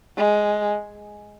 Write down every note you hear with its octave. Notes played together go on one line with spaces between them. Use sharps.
G#3